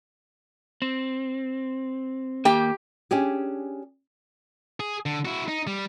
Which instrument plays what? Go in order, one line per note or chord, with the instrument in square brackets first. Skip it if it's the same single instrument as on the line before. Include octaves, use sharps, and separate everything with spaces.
[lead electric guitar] C4
[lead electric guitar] D#2 A#3 [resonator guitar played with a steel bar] G4 G5
[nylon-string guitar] C#4 D4 G4 G#4
[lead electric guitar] G#4
D3
E4 F#4
D#4
G3